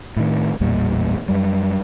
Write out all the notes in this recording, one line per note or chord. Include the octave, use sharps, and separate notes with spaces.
A2 D#3
A1 E2 A#2 G3
F#2 G3